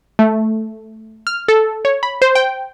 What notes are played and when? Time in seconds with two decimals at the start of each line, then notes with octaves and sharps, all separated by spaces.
0.19 A3
1.27 F6
1.48 A4
1.85 C#5
2.03 B5
2.22 C5
2.35 G5